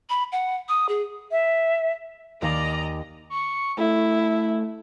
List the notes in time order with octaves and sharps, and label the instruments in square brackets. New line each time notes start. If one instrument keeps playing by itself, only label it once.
[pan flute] B5
F#5
D#6
G#4
[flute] E5
[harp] D#2 F5 G#5 [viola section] D5 D#5 A#5
[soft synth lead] C#6
[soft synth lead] A3 [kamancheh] E4